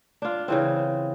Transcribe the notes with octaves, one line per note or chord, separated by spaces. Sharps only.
D4 F4
C#3 E3 C4